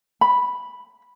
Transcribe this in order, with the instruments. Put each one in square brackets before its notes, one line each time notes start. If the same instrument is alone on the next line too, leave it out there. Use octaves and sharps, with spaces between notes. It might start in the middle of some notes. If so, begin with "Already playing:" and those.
[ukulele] B5